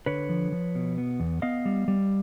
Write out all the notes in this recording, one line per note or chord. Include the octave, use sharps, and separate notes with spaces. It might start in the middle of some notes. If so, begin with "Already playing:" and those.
D3 B4 C#5
F3
F3
B2
B3
E2
B3 D#5 F5
G3
G3